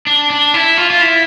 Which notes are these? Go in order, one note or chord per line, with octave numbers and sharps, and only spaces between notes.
D4
D4
E4
F4
F4
E4